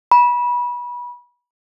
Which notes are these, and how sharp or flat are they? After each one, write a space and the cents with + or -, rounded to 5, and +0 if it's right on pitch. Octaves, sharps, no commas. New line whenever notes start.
B5 -25